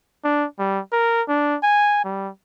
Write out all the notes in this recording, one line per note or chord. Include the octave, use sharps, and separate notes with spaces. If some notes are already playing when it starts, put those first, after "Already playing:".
D4
G3
A#4
D4
G#5
G3